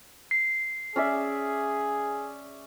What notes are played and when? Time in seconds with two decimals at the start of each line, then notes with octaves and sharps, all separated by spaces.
0.31 C7
0.96 C#4 G#4 D5 E5